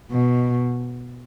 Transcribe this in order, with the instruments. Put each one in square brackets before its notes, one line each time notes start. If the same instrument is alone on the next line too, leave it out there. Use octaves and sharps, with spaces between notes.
[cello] B2